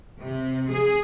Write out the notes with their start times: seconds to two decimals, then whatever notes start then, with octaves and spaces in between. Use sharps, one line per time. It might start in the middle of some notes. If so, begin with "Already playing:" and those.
0.19 C3
0.69 G#4